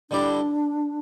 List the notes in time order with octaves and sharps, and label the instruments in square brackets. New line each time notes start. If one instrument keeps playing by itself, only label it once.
[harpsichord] D3 G3 E4 G4 D5 [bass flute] D4